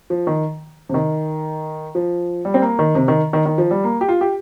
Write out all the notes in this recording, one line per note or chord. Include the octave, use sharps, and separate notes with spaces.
F3
D#3
C3
D#3
F3
G3
C4
A#3
D#3
C3
D#3
D#3
D#3
F3
G3
A#3
G4
F4
G4